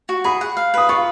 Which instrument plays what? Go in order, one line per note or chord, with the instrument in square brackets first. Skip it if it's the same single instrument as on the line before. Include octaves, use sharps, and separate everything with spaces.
[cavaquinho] F#4
[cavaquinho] G#4 [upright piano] B5
[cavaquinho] F#5
F5
[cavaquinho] B4 [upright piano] D#6
[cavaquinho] F4 [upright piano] C#6